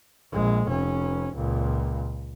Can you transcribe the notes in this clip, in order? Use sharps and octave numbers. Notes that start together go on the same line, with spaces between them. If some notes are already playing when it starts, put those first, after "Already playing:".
A#1 G#3
F1 C#4
C#2 A#2